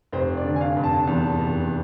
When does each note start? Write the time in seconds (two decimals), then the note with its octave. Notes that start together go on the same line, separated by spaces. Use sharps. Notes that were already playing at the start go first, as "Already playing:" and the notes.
0.13 F1 C5
0.37 D5
0.44 D3
0.56 G#5
0.61 F5
0.76 F1
0.83 A5
1.07 E2
1.39 F1